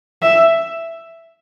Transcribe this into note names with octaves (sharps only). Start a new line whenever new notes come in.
E5